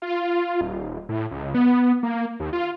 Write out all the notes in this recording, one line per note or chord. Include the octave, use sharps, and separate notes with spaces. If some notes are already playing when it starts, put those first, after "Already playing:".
F4
D#1
A2
C#2
B3
A#3
D#2
F4